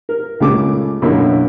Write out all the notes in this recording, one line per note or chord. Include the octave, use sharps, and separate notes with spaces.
A#4
C#2 C#3 A3 A4 D6
F#2 B2 D3 A#3 E4